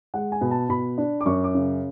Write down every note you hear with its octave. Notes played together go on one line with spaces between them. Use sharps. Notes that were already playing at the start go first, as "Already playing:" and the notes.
G#3 F#5
G#5
B2
A5
B2 B5
D4
D6
F#2 C#6
D6
C#3